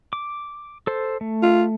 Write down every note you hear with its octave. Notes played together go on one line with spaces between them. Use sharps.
D6
A4 C5
A3
F4